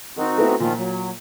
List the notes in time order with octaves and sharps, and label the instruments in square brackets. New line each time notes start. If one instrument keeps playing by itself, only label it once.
[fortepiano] D#3 [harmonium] C4 D#4 F#4
[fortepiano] A3 B3 E4
[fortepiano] A#2 [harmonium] D#3 F3 F4
[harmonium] F#3